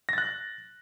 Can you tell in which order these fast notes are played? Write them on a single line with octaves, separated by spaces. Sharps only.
A#6 A6 F#6